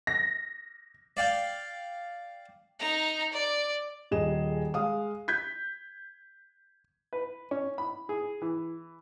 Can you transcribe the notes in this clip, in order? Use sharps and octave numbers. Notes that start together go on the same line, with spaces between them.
A#6
D5 F5 G5
D#4 A#5
D5
D#1 G#4 D#5 E7
G#3 F5 D#6
G6 G#6 B6
B4
C#4
B5
G#4
E3